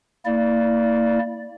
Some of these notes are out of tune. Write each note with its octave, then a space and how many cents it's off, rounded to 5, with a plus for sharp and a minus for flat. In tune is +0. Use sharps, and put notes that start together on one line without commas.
A#3 -25 E4 -25 D5 +0